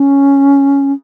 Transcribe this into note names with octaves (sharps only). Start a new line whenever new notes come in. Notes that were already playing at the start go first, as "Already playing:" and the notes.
Already playing: C#4